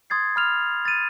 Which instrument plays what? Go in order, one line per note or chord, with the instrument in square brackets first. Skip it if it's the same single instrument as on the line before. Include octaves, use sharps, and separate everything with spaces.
[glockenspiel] C6 D#6 G#6 A6 C7
B5 F6 F7
A6 D#7